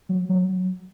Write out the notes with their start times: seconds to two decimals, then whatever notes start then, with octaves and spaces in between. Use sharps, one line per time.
0.09 F#3
0.29 F#3